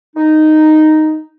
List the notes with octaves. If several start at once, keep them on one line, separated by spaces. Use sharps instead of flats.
D#4